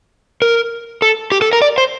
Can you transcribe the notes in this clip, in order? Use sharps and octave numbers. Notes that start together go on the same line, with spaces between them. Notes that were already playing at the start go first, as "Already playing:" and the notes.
A#4
A4
G4
A4
A#4
D5
C5